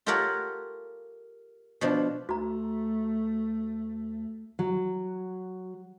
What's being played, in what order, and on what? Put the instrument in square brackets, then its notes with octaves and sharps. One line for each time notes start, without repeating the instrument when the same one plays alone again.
[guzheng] F4 G4 A4 A#4 C#5 F#5
B2 F3 D4
[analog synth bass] D2 [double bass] A3 [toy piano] F#4 A#5
[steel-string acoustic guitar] F#3